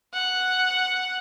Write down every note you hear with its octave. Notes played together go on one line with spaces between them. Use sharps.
F#5